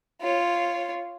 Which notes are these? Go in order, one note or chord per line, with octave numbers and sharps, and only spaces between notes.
F4 C#5